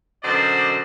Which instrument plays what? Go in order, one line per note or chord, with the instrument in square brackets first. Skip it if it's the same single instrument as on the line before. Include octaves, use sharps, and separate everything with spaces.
[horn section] F#2 B2 D3 C5 D5 D#5